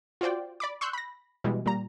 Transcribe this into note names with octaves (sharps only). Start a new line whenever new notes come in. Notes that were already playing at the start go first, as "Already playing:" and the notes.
F4 F#4 C5 D5 G5
D5 B5 D6
C6 C#6 E6 F#6 G6
B5 A#6
B2 E3 G3 G#3
A#2 G3 A#5